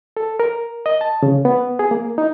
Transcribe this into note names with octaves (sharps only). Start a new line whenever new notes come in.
A4
A#4
D#5
A5
C#3
B3
G#4
A#3
D#4